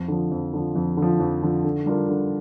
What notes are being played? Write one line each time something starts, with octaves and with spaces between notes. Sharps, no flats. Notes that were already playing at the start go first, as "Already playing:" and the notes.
Already playing: F2
D3 F3
F2
D3 F3
F2
D3
F3
F2
D3 F3
D3
G3 D4 F4 A#4
D3